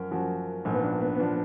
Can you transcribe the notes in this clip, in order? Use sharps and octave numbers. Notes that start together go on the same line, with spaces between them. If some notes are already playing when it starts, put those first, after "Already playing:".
Already playing: F#2 F3 A#4
F#2 F3 F#4
A#1 G#2 F3
B3
D4
B3
B3
F3 D4